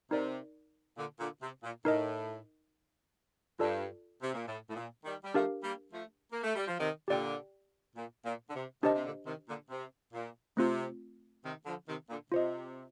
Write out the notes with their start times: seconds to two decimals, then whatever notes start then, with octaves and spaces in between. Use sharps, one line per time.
0.11 C3 D#4 A#4 D5
0.97 A#2 D3
1.19 A#2 D3
1.42 C3
1.63 A#2
1.85 A2 D#4 A#4 D#5
3.59 G2 F4 A4 D5 A5
4.22 C3
4.34 A#2
4.47 A2
4.70 A2
4.76 A#2
5.04 D#3 G3
5.23 G3
5.34 F3 A3 D4 G4 A#4 F5
5.63 G3 A#3
5.92 F3 A3
6.32 A#3
6.43 A3
6.55 G3
6.67 F3
6.79 C3 D#3
7.08 A#2 D3 G4 D5 G5
7.96 A#2
8.24 A#2
8.50 D3
8.54 C3
8.83 C3 D#3 D4 G4 C5 D#5 A5
8.94 C3
9.04 A#2 D3
9.26 C3 D#3
9.48 A#2 D3
9.70 C3
10.13 A#2
10.57 C3 A3 C4 F4
11.44 C3 D#3
11.66 D3 F3
11.88 C3 D#3
12.10 A#2 D3
12.32 C3 F4 C5 D#5